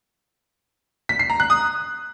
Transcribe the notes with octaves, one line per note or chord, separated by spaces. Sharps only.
B6
C7
A#5
F#6
D#6